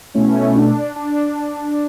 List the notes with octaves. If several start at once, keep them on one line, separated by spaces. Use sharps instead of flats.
B2 A3 C#4 E4
D4
D4